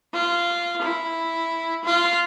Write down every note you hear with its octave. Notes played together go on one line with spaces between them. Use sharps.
F4
E4
F4